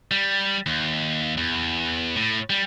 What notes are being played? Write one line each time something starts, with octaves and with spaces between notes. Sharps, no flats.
G3
D#2
E2
A2
G3